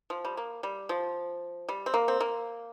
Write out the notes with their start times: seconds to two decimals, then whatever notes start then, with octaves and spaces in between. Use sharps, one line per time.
0.10 F3
0.25 G3
0.37 A#3
0.63 G3
0.89 F3
1.69 G3
1.86 C4
1.94 A#3
2.08 C4
2.21 A#3